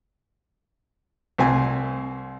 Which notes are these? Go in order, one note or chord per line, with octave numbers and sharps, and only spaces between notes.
C2 C4 G#5